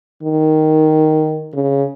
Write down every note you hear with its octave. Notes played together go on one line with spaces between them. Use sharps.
D#3
C#3